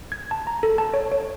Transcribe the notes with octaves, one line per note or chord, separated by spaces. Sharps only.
G#6
A5
A#5
A4
A5
C#5
C#5